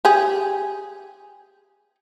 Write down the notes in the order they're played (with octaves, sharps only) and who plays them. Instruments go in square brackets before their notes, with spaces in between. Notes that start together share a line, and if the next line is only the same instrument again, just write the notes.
[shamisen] G4 G#4